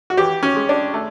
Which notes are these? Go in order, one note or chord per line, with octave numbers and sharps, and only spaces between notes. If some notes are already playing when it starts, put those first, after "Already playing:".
F#4
E3 G4
C#4
G#3
D4
A3